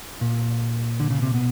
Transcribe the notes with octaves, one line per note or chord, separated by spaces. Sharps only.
A#2
D3
C#3
C3
B2